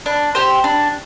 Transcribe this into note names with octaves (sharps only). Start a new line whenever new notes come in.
D4
G4 C5
D4